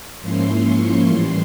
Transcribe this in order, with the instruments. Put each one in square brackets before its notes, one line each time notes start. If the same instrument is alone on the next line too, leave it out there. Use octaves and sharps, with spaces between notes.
[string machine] G#2 F3 A#3 C#4 E4 C6
C#6
A2 E3 G3 C6